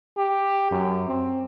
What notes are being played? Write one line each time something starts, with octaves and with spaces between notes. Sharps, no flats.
G4
F#2
C4